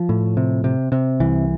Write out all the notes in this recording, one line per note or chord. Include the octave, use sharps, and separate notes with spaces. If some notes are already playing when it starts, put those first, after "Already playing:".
Already playing: F3
A2
C3
C3
C3
C2 E3